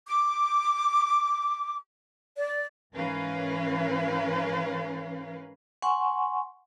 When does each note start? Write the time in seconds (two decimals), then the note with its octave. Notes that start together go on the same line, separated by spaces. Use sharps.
0.06 D6
2.36 D5
2.93 G#2 E3 C#4 A#4 B4 F5
5.82 F#5 G#5 C6 C#6